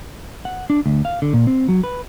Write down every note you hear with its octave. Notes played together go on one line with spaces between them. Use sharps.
F#5
D4
D2
F5
D3
A#2
C4
F#3
B4